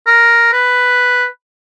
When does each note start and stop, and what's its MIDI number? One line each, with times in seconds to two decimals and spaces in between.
0.07 0.48 70
0.53 1.25 71